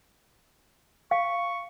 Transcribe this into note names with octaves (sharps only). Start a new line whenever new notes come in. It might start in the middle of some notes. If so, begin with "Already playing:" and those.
F5 C#6